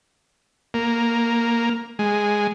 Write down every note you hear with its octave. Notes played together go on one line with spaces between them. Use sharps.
A#3
G#3